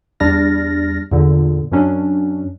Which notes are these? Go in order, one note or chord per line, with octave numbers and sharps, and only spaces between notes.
E2 G3 D4 F6 A6 A#6
E2 A#2 D3
F#2 F#3 C#4 D4